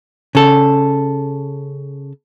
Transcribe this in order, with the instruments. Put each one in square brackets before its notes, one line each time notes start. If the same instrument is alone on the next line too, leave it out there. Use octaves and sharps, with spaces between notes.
[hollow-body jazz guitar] C#3 A4